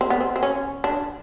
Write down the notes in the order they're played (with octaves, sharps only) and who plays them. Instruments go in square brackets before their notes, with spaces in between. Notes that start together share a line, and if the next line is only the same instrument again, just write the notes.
[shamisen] C4
B3
C4
C4
C#4
D4